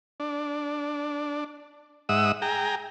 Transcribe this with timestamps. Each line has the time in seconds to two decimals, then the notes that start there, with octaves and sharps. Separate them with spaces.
0.20 D4
2.09 G#2 E5 F#5 D#6 E6
2.42 G#4 G5 A#5